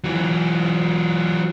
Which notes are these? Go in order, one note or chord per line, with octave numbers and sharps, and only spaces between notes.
E3 F#3